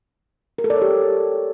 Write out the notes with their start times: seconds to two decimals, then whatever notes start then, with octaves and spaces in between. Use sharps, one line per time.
0.58 A#4
0.64 A4
0.70 D5
0.76 C#5
0.82 G4